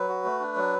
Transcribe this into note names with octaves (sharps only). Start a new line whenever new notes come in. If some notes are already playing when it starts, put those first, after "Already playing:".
Already playing: F#3 B4
F#4
A3
D4
F#3